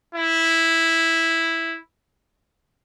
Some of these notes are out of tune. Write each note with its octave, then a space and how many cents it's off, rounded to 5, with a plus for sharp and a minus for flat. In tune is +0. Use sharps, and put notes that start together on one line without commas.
E4 -5